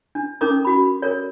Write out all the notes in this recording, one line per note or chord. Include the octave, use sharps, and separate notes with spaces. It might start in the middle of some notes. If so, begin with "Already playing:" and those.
D4
C#4 D#4 A4 A#4 D6 D#6
F#4 B5
A4 A#4 C#5